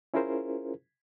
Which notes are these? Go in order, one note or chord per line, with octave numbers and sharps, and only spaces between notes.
C#4 E4 F4 G#4 A#4 C5